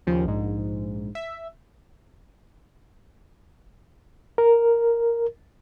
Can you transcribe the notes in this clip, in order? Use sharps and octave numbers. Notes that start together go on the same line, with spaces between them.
D#2 C#3 F3
A#1 G#2
E5
A#4